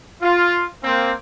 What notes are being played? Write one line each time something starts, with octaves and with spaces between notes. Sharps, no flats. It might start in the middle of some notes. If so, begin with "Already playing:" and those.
F4
A#3 C4